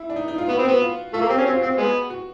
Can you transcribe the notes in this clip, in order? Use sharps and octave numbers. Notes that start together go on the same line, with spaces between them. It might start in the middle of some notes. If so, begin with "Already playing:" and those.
Already playing: E4
D4
D#4
D#4
F4
B3 F#4
C4
B3 F#4
F4
A3 F4
A#3
C4 G4
C#4
C4 F#4
F4
C4 F#4
G#3 B3
F#4